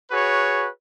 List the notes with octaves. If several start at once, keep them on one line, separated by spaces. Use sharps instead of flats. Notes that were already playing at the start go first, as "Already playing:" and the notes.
F#4 G#4 B4 C#5